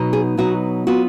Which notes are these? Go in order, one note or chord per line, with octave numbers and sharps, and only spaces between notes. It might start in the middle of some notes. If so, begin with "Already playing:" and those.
Already playing: B2 F#3 B3 D#4
G#4
B2 F#3 B3 D#4 F#4
F#3 B3 F4 F#4